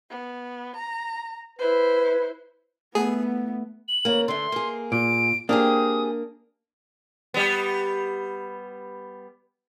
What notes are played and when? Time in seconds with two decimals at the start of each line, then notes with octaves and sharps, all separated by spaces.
0.11 B3
0.76 A#5
1.59 E4 B4 C5
2.95 A3 B3 E4 G#4 F#5
3.88 F#7
4.05 C#3 A#3
4.28 D3 A3 C6
4.52 A#3 G#4
4.92 A#2 D7
5.49 A#3 C4 D4 G4 G#4 D#6
7.34 G3 B3